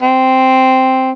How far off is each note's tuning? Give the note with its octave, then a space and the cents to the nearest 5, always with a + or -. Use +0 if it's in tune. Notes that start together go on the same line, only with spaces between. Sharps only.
C4 -5